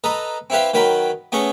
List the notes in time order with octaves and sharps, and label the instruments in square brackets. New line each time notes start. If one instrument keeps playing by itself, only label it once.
[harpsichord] A4 B4 D#5 A#5
C4 E4 G4 B4 F5
D#3 F#3 B4 G5 B5
A3 B3 C#4 G#4 C#6